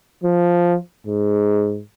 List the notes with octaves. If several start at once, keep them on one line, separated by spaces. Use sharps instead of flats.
F3
G#2